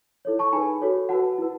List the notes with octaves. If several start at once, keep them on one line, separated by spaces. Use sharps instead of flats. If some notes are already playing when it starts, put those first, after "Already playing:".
E4 A4 C#5
A5 C#6
D#4 G#4 B4 G#5 B5
F#4 A4 C#5
F#4 B4 F#5 A5
E4 B4